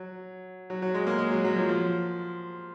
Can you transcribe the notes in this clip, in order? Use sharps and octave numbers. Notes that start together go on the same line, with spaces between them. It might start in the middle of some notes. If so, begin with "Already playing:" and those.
Already playing: F#3
F#3
F#3
G#3
A#3
G#3
F#3
F#3
F3
F3